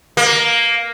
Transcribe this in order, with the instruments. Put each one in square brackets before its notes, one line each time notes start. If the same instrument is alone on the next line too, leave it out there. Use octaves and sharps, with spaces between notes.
[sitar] A#3